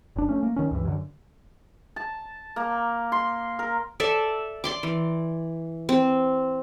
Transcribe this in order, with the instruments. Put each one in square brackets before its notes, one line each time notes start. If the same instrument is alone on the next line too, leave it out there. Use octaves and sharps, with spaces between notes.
[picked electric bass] F#1 D4
A3 C#4
A#3
D#3 C#4
C#2 G2 E3
F#2 D3
[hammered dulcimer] A5
A#3
C6
A#4
[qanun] A4 D5 E5
D5 C6 D6
E3
C4